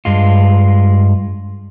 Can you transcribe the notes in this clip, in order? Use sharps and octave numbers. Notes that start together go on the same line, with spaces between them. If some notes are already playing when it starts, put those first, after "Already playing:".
G2 G#3 F4